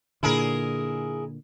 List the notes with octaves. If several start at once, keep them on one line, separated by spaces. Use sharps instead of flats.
A#2 D3 E4 G#4 A#4